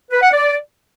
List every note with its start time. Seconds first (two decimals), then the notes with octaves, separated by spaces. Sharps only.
0.11 B4
0.22 F#5
0.33 D5